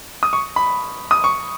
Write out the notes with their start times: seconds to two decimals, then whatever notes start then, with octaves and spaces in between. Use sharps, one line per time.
0.23 D#6
0.33 C#6
0.56 B5
1.11 D#6
1.24 C#6